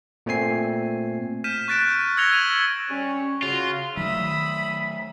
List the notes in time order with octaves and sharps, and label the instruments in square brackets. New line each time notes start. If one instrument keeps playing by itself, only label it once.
[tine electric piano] A#2 A3 C4 G#5 C7
[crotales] F6 G6 B6 D#7 E7
C#6 F#6 A6 B6 D7 E7
E6 G#6 A#6 C#7 F7 G7
G#6 D#7 F7 F#7
[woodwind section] G3 C#4 C#5
[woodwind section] C#3 F#4 [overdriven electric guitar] F4
[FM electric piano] D#3 [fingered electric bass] F#3 A3 [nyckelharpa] E5 D#6 [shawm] B5